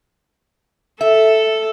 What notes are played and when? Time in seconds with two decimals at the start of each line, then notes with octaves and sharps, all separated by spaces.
1.01 A4 E5